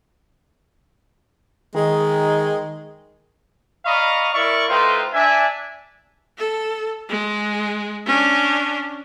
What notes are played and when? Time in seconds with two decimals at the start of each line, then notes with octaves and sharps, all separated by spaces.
1.76 D#3 G#3
3.85 D5 D#5 F5 A#5 B5 C#6
4.33 E4 A#4 D5 E5 C#6
4.68 A3 D#4 F4 B4 C5 G5
5.13 D4 E5 G#5
6.38 A4
7.09 G#3
8.06 C#4 D4